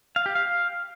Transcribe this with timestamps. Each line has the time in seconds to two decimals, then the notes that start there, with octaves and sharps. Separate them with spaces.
0.16 F5
0.26 G4
0.35 F5